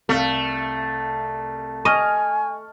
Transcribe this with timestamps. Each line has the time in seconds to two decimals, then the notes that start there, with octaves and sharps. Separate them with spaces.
0.09 C2 A3 F5
1.85 D#5 G#5 C#6 F6